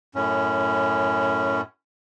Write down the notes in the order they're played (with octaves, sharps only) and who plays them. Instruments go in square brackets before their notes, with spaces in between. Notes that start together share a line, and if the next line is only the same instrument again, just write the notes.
[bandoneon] F#2 A2 C#4